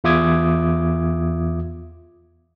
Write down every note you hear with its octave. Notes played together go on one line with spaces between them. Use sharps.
E2 F4 E5 D6 D#6 G#6